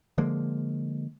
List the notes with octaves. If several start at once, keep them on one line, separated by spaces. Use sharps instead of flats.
D3 F3 G#3 A#3